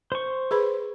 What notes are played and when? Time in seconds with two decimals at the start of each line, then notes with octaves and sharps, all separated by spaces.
0.12 C5 C#6
0.51 G#4 B4 B5